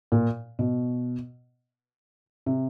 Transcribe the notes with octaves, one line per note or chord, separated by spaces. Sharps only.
A#2
B2
C3